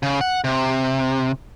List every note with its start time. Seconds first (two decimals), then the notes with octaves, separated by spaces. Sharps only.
0.03 C#3
0.21 F#5
0.44 C3